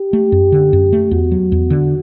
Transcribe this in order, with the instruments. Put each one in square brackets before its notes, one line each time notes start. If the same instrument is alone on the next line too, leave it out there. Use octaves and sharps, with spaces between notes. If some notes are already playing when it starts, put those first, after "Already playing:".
Already playing: [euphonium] G4
[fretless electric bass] A3
F#2
D3
F#2
A3
[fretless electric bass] E2 [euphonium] F#4
[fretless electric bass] F#3
E2
D3